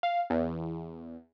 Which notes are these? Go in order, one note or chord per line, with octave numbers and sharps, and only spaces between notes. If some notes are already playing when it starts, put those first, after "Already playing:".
F5
E2